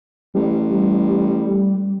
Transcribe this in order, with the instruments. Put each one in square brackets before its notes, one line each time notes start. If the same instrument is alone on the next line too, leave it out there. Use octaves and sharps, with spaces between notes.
[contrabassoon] A1 [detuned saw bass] G3